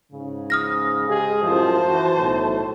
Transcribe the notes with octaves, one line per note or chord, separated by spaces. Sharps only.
G#2 C#3
D#6 F6 A#6
G#3 G4 G#4
F#2 A2 F3 C5 A5
E3 F#4
B1 A2